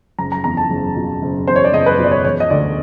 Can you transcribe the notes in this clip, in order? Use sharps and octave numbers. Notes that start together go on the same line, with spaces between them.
F#1 A#5
A#5
E2 A#5
A5
F#1
B2
F#1
E2 C5
C#5
D5
F#1 D#5
B4
B2
D5
C#5
E1 C#5
D#5
D2 D5